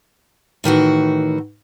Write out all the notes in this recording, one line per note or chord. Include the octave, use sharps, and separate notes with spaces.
A2 D#3 E3 F#4